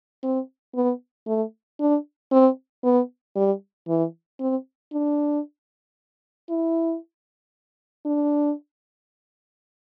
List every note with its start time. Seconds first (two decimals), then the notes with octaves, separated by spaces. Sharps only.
0.23 C4
0.75 B3
1.27 A3
1.80 D4
2.32 C4
2.84 B3
3.36 G3
3.88 E3
4.40 C4
4.93 D4
6.49 E4
8.05 D4